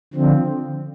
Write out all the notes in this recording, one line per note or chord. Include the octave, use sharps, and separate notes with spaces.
D3 F3 C4